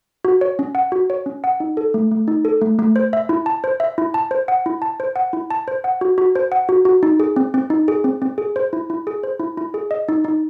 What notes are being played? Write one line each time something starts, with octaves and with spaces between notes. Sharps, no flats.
F#4
C#5
C#4
F#5
F#4
C#5
C#4
F#5
D#4
A4
A3
A3
D#4
A4
A3
A3
C5
E5
E4
A5
C5
E5
E4
A5
C5
F#5
E4
A5
C5
F#5
E4
A5
C5
F#5
F#4
F#4
C5
F#5
F#4
F#4
D#4
G#4
C4
C4
D#4
G#4
C4
C4
G#4
C5
E4
E4
G#4
C5
E4
E4
G#4
D#5
D#4
D#4